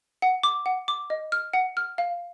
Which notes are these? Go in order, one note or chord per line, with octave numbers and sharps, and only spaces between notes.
F#5
D6
F#5
D6
D#5
F6
F#5
F6
F5